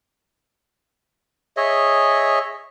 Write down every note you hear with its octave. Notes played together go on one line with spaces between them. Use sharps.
G#4 C#5 D#5 E5